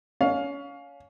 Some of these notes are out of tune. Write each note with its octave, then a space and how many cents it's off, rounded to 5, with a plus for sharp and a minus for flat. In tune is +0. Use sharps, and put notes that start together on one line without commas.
C#4 +25 F5 +20